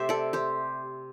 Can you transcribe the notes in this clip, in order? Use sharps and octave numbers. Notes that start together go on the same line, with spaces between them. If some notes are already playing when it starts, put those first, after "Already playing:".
Already playing: C3 A3 C4 G4 C5 E5
A4 D5
G4 C5